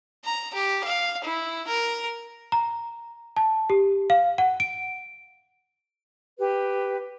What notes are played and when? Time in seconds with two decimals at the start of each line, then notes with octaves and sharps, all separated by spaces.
0.24 A#5
0.54 G4
0.84 F5
1.24 E4
1.67 A#4
2.52 A#5
3.37 A5
3.70 G4
4.10 F5
4.38 F#5
4.60 D7
6.38 G4 B4